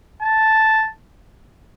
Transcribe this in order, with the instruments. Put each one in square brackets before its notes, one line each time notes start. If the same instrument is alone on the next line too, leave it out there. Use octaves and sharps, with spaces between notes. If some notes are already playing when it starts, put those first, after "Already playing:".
[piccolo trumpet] A5